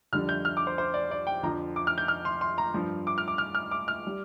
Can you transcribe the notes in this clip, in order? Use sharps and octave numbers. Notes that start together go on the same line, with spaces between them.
F2 D3 G3 F6
G6
F6
D6
C5
C5
D5
D5
G5
F2 D3 F3 A#5
D6
F6
G6
F6
C6
C6
A#5
G2 F3
D6
F6
D6
F6
F6
D6
F6
G3